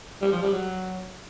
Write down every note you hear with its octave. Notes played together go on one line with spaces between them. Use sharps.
G3
F3
G3
F#3